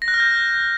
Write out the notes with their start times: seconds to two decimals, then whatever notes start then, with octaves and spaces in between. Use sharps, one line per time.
0.02 A#6
0.08 F#6
0.14 F6
0.20 G6